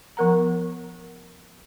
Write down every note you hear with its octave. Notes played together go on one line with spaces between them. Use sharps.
F3 B3 A#4 F#5 A#5